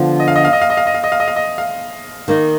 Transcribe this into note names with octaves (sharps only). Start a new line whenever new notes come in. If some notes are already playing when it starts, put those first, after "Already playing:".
Already playing: D3 F3 B3 F4
D#5
F5
D#5
F5
D#5
F5
D#5
F5
D#5
F5
D#5
F5
D#5
F5
D#5
F5
D#3 A#3 D#4